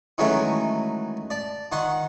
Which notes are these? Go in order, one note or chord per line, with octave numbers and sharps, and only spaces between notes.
D#3 E3 F#3 G#3 A3 C#4
D5 A5
D#3 F#5 C6 C#6